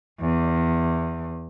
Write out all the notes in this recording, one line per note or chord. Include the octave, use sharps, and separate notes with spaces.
E2